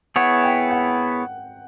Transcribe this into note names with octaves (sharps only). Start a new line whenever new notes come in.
B3 E4 G#4 C#5 F#5
G5
F#5